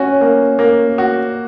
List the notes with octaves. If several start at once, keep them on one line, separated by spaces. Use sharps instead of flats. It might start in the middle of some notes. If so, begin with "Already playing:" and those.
Already playing: C#4 F#4
A#3
A#3
F#4